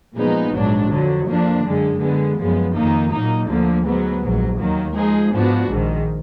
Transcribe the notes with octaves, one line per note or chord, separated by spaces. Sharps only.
A#2 F3 G#3 B3 D#4
A#1 G#2 F#3 D4
F2 D3 F#3
F2 F3 A#3 D4
F#2 D3 G#3
D3 G#3 B3
F#2 F3 G#3 B3
F2 D#3 A#3 D#4
A#2 F#3 A#3 D#4
D2 D3 F3 A#3
G#2 F#3 B3
A#1 G#2 F#3
D#2 D#3 F#3 A#3
F3 G#3 D#4 G#4
G#2 F3 B3 D4 F#4
A#1 G#2 D#3